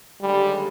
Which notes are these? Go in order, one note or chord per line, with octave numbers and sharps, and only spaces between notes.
D#2 D3 G3 G#3